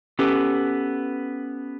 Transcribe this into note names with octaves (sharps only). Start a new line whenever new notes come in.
B3 C#4 G4 A4 B4